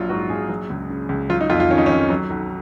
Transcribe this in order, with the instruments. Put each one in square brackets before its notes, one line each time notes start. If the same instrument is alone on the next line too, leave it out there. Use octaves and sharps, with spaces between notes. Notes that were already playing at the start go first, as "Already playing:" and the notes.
Already playing: [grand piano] A#1 F#3 F4
G#2 F#4
A#1 G#4
F#3
C#2
C#3
C#2
F#3 F4
D#4
F2 F4
F4
D#3 C#4
D#4
C#4
F2
F#3
B1